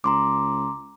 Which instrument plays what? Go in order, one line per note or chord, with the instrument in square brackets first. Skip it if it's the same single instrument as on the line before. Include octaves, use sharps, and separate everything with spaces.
[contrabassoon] C#2 [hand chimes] A#5 C6 D6